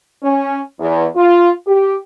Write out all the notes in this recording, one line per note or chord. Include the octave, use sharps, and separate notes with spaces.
C#4
E2
F4
G4